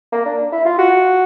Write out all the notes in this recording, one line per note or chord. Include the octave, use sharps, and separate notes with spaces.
A#3
D4
E4
F4
F#4